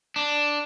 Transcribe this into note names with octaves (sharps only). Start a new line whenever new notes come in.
D4